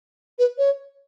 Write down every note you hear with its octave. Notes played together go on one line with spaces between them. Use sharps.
B4
C#5